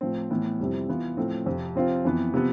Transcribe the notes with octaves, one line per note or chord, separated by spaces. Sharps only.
A2 F3 C4
A2 E3 B3
F2 C3 G3 C4 E4
E3 B3 F4
A2 F3 A3 C4 E4
F2 C3 F3
C3 F3 C4 F4
F2 E3 B3
C3 F3 B3